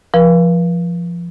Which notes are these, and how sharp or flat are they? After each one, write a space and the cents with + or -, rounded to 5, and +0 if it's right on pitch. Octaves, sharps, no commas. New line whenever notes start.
F3 -20 B4 -45